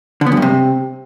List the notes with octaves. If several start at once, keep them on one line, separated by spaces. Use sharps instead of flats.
D3
B3
F#2
G2
C3